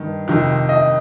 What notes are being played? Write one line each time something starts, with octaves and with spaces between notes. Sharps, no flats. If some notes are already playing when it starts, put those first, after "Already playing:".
Already playing: G2 D#3
F2 C3 D#3
D#5